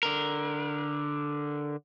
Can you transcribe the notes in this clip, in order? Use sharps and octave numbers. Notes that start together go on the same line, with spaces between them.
D3 A#4